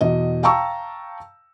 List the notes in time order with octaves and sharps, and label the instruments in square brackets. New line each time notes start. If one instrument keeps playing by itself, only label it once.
[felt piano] E2 B2 D#5
F5 G5 A5 A#5 C#6 E6